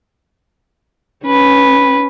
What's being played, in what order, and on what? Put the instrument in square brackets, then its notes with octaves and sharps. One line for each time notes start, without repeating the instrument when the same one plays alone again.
[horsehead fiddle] C#4 [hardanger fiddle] B4